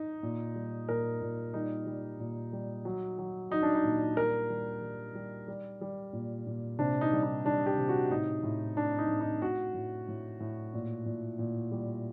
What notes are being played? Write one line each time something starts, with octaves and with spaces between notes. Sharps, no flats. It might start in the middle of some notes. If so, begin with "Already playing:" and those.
Already playing: D#4
A#2
G3
A#2 A#4
A#2
G3 D#4
G3
A#2
G3
F#3
F#3
F#3 D#4
D4
D#4
A#2
G3 A#4
G3
G3
G3
G3
G3
A#2
A#2
C3 D4
D#4
G3
D#4
G3 D4
G4
C3
F#4
A2 D#4
A2
A2 D4
D#4
A2
D#4
A2 F#4
A2
A2
A2
A#2
A#2
A#2
G3